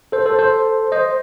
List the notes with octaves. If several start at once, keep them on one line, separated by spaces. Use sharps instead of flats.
A4 C5
A4 C5
A4 C5
C5 D#5